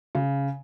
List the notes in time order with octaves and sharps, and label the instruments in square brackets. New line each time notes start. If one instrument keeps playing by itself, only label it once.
[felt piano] C#3